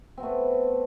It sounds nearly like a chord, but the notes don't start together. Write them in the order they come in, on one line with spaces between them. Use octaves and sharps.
C4 B3 A3